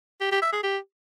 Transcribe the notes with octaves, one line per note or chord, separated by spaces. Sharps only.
G4
G4
E5
G#4
G4